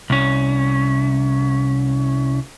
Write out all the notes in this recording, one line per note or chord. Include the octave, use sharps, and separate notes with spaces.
C2 C#4